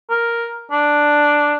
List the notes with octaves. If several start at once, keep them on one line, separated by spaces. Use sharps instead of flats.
A#4
D4